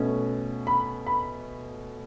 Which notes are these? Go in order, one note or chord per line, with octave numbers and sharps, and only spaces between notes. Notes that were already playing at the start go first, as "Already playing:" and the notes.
Already playing: B2 A3 C#4
B5
B5